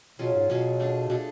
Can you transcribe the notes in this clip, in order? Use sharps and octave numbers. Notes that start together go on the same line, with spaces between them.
B2 F#3 C#4 F4 G#4
G#2
B2 F#3 C#4 F4 G#4
A3 D4 G#4
B2 A3 D4 G#4